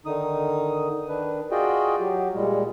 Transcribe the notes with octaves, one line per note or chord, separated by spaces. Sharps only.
D3 D#3 D#4 D#6
D#3 D4 B4
F4 F#4 G#4 D5 D#5 G5
F#3 G4
A#2 G3 G#3